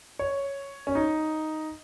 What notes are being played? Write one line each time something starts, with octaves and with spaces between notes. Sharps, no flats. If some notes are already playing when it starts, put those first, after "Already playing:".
C#5
C#4
D#4